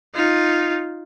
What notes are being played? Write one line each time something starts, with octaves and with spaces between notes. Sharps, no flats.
D#4 F4